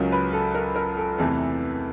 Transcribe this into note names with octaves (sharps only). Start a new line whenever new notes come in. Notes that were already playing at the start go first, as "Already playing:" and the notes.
Already playing: C#2 C#3 F#3 A#4
B4
A4
A#4
A#4
A4
E2 C3 E3 A3 A4